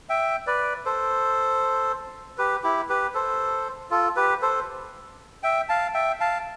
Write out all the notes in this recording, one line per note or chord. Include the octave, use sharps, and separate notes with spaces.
E5 G5
B4 D5
A4 C5
G4 B4
E4 G4
G4 B4
A4 C5
F4 A4
G4 B4
A4 C5
E5 G5
F5 A5
E5 G5
F5 A5